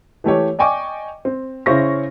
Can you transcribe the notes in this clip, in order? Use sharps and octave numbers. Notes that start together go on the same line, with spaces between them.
E3 A3 G4 C#5
D5 D#5 G5 G#5 C#6 D6
C4
C#3 C#4 E4 C5 C#6 A#6